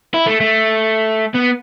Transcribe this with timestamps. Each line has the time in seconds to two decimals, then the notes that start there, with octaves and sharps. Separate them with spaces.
0.14 E4
0.27 A3
0.40 A3
1.34 B3